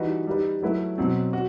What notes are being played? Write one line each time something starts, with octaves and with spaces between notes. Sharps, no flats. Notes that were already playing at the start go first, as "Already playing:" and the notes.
Already playing: E3 G3 D#4 F#4 B4
G3 D#4 G4 B4
F#3 A3 E4 B4
B2 F#3 C4
F#4